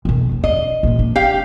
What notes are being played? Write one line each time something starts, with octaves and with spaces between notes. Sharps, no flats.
B1 D#3
D#2
D4 D#5
A#1 G#3
D4
G4 F5